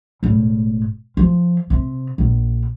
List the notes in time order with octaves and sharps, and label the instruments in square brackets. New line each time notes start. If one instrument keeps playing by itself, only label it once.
[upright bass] E1 A2
F3
C3
A#1